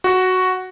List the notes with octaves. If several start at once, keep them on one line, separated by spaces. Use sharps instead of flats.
F#4